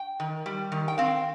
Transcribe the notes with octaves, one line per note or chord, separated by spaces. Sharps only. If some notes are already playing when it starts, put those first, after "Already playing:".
Already playing: G5
D#3
G3
D#3
G5
C4 F5